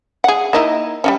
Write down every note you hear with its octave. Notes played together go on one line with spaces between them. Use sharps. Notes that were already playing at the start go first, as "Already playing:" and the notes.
G#4 F#5
A#3 D#4 E4
G3 G#3 C#4